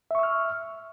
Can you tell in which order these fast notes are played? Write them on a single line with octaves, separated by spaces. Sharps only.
E5 C#6 E6 F6